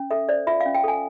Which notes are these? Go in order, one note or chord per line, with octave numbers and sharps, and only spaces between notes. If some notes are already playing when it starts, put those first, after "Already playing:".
Already playing: C#4
A4 E5
C5 D5
F4 E5
F5
C#4
G5
A4 G#5